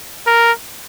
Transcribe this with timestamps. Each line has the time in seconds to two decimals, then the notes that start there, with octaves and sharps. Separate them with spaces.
0.27 A#4